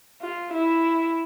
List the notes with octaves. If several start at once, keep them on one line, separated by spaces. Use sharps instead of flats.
F4
E4